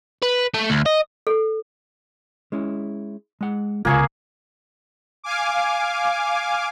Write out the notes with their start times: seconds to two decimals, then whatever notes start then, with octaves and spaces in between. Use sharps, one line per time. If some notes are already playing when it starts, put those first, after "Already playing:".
0.22 B4
0.54 A3
0.70 D2
0.86 D#5
1.27 A4
2.52 G#3 C#4 E4
3.41 G#3 F#5
3.85 C#2 C3 G#3 A#3 F4 G#4 C#6
5.24 F5 G#5 D6